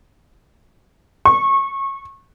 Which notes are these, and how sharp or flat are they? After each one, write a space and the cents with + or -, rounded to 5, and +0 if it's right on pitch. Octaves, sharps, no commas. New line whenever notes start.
C#6 -25